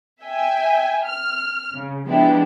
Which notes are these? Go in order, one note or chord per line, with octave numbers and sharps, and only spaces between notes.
E5 G5 G#5
F6
C#3
F3 G#3 B3 D4 E4 G4